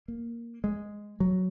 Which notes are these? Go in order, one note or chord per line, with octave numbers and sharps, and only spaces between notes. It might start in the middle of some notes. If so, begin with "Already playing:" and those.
A#3
G#3
F#3